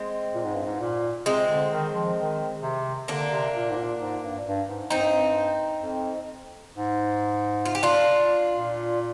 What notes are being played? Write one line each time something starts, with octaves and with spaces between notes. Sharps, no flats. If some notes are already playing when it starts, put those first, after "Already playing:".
Already playing: G#3 C4
A#2
G#2
G2
G#2
A#2
C3 G#3 C4
D3
D#3
F3
D#3
C3
D3 A#3 D4
C3
A#2
G#2
A#2
G#2
G2
G2
G#2
G2 C4 D#4
F2
G#2
F4
G4
D4 F4
A#2